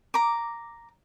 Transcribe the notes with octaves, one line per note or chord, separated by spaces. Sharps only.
A#5 D6